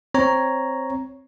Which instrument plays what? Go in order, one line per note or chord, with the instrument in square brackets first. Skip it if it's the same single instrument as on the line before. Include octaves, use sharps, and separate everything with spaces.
[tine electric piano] C4 C#5 A#5